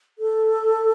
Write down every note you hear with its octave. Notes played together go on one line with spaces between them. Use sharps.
A4